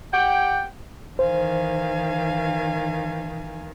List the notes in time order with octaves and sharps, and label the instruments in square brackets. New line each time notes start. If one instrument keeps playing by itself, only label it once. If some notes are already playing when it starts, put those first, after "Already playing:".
[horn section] G4 F#5 G5
[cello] D#3 E3 [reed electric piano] C5 [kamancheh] F5 G#5